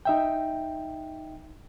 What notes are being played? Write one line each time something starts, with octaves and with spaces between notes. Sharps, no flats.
D#4 E5 G5